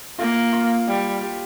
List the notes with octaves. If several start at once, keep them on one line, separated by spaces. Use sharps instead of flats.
A#3 F4
F4
G3
G4